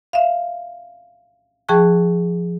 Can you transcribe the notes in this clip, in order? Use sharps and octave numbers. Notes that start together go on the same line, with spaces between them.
E5 F5
F3 G#4 G5 A5 C#6 F#6